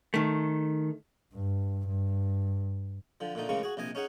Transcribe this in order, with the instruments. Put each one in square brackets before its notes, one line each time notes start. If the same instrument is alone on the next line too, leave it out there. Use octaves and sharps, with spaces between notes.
[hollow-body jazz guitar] D#3 A3
[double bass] G2
G2
[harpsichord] D3 F3
A#2 D3 A3 D#4
A1 C#3 G#3 A#3 C#6
F#4 G#4
A#1 C3 D#5 G#5
C#4 D#4 G#4 F#5